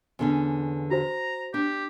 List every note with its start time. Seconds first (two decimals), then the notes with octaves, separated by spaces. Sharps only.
0.19 E2 D3 C#4
0.91 F#4 C5 A#5
1.54 D4 G4